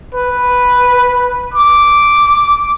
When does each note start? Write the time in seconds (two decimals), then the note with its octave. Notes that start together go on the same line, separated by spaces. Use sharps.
0.15 B4
1.54 D6